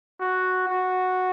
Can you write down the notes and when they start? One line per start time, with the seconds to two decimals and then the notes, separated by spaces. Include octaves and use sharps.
0.20 F#4
0.68 F#4